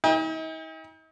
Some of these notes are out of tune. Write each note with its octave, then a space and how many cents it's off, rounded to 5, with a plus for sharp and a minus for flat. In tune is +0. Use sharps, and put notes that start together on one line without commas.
D#4 +45 G5 +45